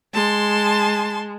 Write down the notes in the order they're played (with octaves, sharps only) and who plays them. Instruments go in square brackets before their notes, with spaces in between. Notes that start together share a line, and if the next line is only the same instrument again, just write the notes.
[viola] G#3 [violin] A5 C6